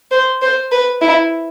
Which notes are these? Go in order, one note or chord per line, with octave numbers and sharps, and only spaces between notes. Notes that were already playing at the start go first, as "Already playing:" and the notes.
C5
C5
B4
E4